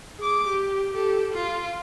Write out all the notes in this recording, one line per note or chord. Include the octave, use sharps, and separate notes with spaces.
G#4 D6
G4
G4 A4
F4